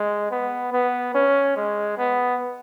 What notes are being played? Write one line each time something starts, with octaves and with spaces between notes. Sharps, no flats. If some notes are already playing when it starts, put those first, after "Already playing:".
Already playing: G#3
B3
B3
C#4
G#3
B3